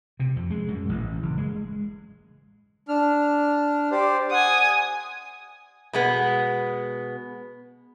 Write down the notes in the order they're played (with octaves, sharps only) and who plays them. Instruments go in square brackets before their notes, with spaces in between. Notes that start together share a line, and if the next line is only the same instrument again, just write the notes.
[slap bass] C3
F2
G#3
F#2
A1
F#1
G#3
[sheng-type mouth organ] D4 F6
G4 C5 D5
[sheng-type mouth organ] F#5 [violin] G#5 D#6
[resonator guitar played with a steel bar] B2 G#3 B3